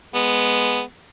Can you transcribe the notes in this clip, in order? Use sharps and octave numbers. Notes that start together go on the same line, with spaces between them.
G#3 B3